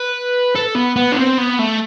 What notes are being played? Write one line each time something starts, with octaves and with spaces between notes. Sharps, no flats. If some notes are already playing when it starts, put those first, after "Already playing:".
Already playing: B4
A4
B3
B3
D4
C4
B3
A3